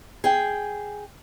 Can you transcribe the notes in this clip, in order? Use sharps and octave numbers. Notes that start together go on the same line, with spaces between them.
G#4 G5